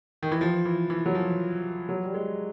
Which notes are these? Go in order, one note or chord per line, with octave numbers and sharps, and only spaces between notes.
D#3
E3
F3
E3
E3
F#3
F3
F#3
G3
G#3